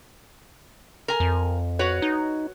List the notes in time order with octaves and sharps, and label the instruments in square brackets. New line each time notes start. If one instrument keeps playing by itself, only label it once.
[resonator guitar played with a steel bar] A#4 G#5
[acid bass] F2
[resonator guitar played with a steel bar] F#4 B4 C#5
[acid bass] D#4